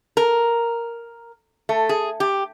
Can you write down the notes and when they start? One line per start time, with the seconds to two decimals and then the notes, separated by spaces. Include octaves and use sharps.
0.17 A#4
1.69 A3
1.89 G#4
2.20 G4